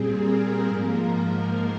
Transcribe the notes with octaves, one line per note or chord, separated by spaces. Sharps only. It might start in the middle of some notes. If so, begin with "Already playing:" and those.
Already playing: A#2 G3 C4 G#4
A#4
G#2 F3 A#3 A#4